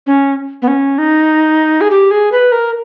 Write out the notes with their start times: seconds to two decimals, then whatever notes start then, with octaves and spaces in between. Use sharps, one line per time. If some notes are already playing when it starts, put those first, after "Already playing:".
0.07 C#4
0.62 B3
0.68 C#4
0.98 D#4
1.81 G#4
1.91 G4
2.11 G#4
2.32 B4
2.52 A#4